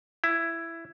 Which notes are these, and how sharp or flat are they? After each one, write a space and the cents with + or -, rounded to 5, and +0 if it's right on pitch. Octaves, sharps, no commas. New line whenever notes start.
E4 +10